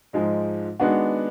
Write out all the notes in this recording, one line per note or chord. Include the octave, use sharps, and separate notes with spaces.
G#2 F3 G#3 D#4
D#3 G#3 B3 D4 F#4